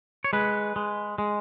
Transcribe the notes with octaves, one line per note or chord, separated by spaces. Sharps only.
C#5
G#3 B4
G#3
G#3